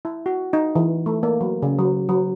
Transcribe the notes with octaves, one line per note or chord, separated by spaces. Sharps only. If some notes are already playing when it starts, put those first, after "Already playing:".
E4
F#4
D#4
E3
A3
A#3
F#3
C#3
F#3
F#3